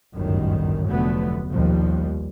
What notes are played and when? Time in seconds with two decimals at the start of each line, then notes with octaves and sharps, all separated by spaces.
0.14 G1 C#2 F#2 A2 D#3
0.87 F1 D2 D3 F#3 A3 B3
1.48 F1 A#1 D#2 B2 F3 G3